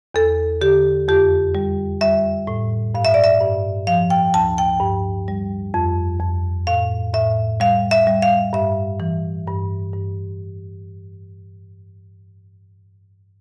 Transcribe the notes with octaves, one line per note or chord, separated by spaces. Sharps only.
E2 A4
D3 G4
F2 G4
G3
G3 E5
A2
G2 F5
E5
D5
E5
G2
F3 F5
G5
D2 A5
G5
G2
G3
F2
F2
A2 F5
A2 E5
G3 F5
E5
G3
F5
G2 E5
E3
G2
G2